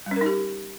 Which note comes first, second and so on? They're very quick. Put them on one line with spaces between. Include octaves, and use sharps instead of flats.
G3 C#4 A#4 D#4 G4